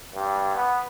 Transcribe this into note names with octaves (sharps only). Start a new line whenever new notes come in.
G2
B3